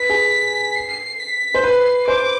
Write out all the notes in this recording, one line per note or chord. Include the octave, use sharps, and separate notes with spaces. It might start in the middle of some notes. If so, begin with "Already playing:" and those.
Already playing: B4 B6
G#4
C7
B6
C5
B4 C7
C5 D6